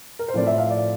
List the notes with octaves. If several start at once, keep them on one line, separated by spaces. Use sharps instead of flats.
A#4
C5
A2 F3 C4 D5
E5
F5
D5